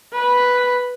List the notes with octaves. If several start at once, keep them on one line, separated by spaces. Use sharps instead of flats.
B4